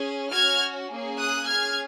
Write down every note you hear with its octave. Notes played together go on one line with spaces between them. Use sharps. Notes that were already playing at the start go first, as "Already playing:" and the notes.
Already playing: C#4 G#4
C#4 F#4 F6 G#6
A#3 C#4 G#4
D#6 F#6
C#4 G#4 F6 G#6